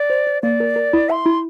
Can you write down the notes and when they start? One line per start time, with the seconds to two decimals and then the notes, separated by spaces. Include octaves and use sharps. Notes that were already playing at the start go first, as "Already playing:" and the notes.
Already playing: D5
0.10 C5
0.27 C5
0.43 A#3 D5
0.60 A#4
0.76 A#4
0.93 E4
1.09 E5 C6
1.26 E4